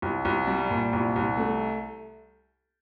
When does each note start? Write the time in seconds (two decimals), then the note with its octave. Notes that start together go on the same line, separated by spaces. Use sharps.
0.02 C2
0.25 C2
0.47 G3
0.70 A#2
0.93 C2
1.16 C2
1.37 A3